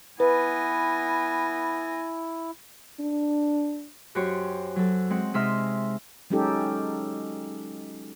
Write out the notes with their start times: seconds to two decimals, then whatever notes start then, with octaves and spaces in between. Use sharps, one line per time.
0.20 B3 E4 B4 G#5 A#6
3.00 D4
4.15 F#2 F#4 G4 C5 C#5
4.76 F#3 A4
5.10 G#3 C4 F#5
5.34 C3 G#3 D#4 E5 C6 F6
6.30 F#3 G#3 C#4 D#4 G4 A4